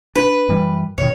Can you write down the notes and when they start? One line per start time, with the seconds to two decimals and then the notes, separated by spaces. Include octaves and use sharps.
0.16 D4 B4
0.49 F#2 E3 G3
0.98 F2 B2 D#3 C#5